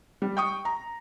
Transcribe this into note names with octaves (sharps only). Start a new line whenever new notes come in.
G3
G5 C#6 D#6
A#5